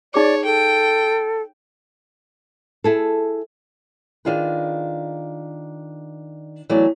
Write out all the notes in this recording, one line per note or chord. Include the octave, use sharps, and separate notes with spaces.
D#4 G#4 C#5 D5 D6
A4 G5
E4 G#4 A4
D#3 D4 F4 G#4 B4
E3 F#3 A3 B3 D5